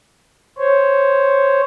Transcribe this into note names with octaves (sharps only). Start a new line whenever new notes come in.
C5 C#5